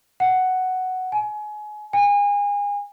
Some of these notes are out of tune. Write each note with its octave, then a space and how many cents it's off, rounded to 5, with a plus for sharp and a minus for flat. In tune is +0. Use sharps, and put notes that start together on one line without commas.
F#5 +5
G#5 +25
G#5 -30